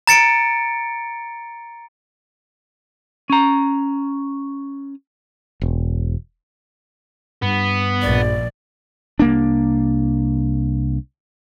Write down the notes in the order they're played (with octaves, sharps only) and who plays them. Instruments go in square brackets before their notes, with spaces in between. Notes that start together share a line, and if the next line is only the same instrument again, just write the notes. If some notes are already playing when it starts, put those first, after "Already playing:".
[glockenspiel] A#5 A6 C#7 D7
[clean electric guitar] C#4 A#5
[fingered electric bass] E1
[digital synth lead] G2 [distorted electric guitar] B3
[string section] A#1 [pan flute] D5
[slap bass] C2 A#3 D4